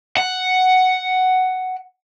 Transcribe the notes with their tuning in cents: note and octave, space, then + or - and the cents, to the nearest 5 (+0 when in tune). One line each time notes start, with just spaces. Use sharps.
F#5 +5